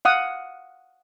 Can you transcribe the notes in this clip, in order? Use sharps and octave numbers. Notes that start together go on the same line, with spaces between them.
F5 F#5 D#6